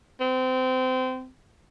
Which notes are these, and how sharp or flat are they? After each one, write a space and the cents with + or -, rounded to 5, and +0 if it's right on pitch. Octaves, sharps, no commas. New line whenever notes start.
C4 -25